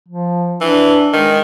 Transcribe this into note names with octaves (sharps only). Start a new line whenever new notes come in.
F3
E3 D4
D#3 G#3